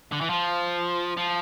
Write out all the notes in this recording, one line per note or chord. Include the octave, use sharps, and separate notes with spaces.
D3
E3
F3
F3